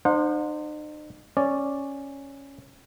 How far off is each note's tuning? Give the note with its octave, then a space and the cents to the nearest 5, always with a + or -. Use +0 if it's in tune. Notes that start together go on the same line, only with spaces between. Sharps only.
D#4 -45 C5 +0 F#5 -40
C#4 -5 D5 +0